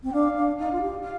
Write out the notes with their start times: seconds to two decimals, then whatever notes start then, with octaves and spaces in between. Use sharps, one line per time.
0.04 C4
0.09 G5
0.13 D4 F5
0.36 D4
0.59 D#4 F5
0.72 F4
0.81 G4
1.03 F5